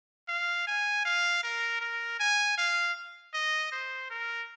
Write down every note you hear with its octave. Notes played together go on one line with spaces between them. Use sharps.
F5
G#5
F5
A#4
A#4
G#5
F5
D#5
C5
A#4